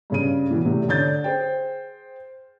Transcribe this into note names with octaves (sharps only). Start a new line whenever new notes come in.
G2 C#3 D#7
B2 E3
E2 A2 C3
D3 D4 C#5 G6 A6
G#4 C5 G5